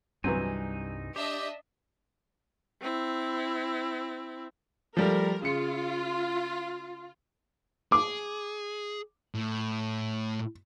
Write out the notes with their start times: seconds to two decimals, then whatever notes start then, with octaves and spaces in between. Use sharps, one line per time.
0.24 C2 G2 E3 F#3 C4 D#4 G#5
1.16 D4 G4 D#5 E5
2.81 C4 E4
4.97 F3 G3 A3 A#4
5.42 C#3 F4 C#7
7.92 G#4 D6
9.35 A2